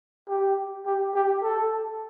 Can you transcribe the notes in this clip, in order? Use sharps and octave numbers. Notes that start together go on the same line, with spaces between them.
G4
G4
G4
A4